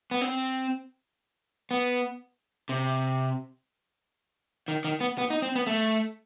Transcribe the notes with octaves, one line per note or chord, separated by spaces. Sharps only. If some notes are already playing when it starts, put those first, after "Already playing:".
B3
C4
B3
C3
D#3
D#3
B3
B3
D#4
C4
B3
A3